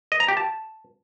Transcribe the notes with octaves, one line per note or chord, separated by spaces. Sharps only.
D#5
A#5
G4
A5